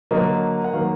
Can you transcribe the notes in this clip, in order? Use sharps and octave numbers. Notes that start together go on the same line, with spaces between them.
D3 F#3 A#3 D#5
F#5
D#3 F#3 A#3 F5